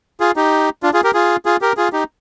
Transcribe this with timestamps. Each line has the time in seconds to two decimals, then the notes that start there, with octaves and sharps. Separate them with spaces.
0.20 F4 G#4
0.36 D#4 G4
0.83 D4 F4
0.93 F4 G#4
1.04 G4 A#4
1.14 F4 G#4
1.45 F4 G#4
1.61 G4 A#4
1.77 F4 G#4
1.93 D#4 G4